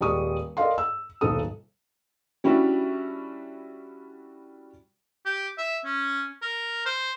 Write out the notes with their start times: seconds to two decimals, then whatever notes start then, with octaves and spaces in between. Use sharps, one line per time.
0.01 D#1 G3 G#3 D5 C#6 D#6
0.57 A4 A#4 D5 D#5 F5 C6
0.78 E6
1.21 D#1 B1 G#2 A4 D#6
2.44 G3 C#4 D4 E4 F#4
5.26 G4
5.58 E5
5.85 C#4
6.42 A#4
6.86 C5